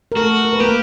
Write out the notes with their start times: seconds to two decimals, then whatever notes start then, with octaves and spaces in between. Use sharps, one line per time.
0.12 A#4
0.16 A3 F#4 A4
0.45 A#4
0.53 B4
0.60 A#3 G4 A#4